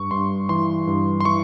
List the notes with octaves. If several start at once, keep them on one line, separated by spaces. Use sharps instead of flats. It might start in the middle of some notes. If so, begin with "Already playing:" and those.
Already playing: G2 C#6
G2 C6
E3 C6
G2
C6
E3 C#6